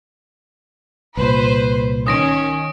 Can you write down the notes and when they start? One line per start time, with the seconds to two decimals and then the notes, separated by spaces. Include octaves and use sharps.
1.17 C2 A#2 B4 C5
2.07 D#3 C#4 D#6 A#6 D7